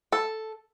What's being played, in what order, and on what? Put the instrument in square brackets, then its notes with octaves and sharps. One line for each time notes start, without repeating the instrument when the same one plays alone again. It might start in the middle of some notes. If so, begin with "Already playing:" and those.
[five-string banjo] A4